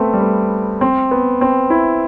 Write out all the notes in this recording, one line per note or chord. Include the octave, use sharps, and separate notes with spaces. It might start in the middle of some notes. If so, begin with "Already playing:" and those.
Already playing: A3 B3 C4
G3
A3
C4
B3
C4
E4